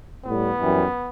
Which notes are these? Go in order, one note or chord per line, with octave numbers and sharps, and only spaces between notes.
A2 G3 B3
F#2 E3 G3